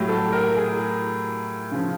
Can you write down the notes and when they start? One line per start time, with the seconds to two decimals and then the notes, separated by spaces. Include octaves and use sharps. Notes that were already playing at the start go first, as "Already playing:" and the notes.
Already playing: A2 F#3 G4
0.09 A4
0.32 A#4
0.56 G#4
1.71 C#3 F3